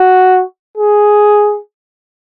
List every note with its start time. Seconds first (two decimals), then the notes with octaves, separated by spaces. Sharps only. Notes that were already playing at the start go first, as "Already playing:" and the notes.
Already playing: F#4
0.77 G#4